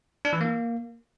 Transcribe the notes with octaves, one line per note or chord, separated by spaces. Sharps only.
D4
E3
A#3